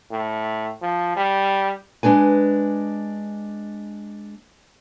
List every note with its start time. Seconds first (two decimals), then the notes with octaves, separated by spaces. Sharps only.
0.11 A2
0.82 F3
1.16 G3
2.03 G#3 D4 B4 G#5